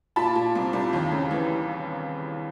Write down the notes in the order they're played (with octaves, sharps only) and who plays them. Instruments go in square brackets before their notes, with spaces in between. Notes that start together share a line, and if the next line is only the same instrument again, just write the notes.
[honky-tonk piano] A#2 A5 B5
A#2
C2
C2
D#2
C#3
E3